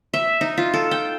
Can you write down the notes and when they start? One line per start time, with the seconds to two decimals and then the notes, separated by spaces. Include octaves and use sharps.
0.14 E5
0.41 D#4
0.58 F4
0.74 A4
0.91 G5